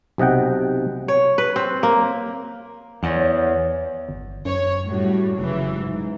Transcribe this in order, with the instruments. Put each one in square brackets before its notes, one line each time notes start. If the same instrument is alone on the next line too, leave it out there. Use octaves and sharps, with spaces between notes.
[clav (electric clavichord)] B1 C3 D#5 F#5 G5
[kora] C#5
B4
C4
A#3
[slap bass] E2 [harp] C#5 D#5 F#5
[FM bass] G1
[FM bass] F#2 [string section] C#5
[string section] A2 G3 F#4
[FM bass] F1 [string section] C#3 E3 F#3
[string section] G#2